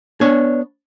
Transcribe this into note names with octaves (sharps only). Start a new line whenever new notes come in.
B3 D4 C#5